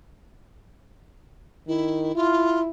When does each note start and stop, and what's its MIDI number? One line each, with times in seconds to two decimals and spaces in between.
1.67 2.11 51
1.67 2.14 64
2.15 2.71 64
2.15 2.61 65